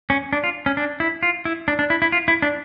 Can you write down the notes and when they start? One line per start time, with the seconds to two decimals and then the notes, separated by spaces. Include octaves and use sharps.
0.10 C#4
0.33 D4
0.44 F4
0.66 C#4
0.77 D4
1.00 E4
1.23 F4
1.45 E4
1.68 D4
1.79 D4
1.90 E4
2.02 E4
2.12 F4
2.28 E4
2.42 D4